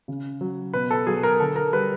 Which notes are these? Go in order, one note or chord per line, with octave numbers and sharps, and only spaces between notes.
C#3
F#3
B2 B4
A4
F#3 G#4
A#4
D3 A4
A#4
G3 B4